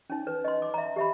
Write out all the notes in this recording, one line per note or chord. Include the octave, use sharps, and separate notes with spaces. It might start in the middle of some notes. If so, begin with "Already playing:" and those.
C#4 D#4
B4
D#5 C6
D6
E5 A#5
G4 E5 B5